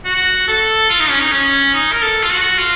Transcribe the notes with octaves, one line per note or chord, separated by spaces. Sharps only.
F#4
A4
F4
D#4
C#4
D#4
C#4
D#4
A#4
A4
F4
F#4
F4